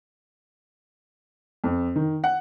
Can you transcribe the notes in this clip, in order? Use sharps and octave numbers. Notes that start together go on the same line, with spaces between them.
F2
D#3
F#5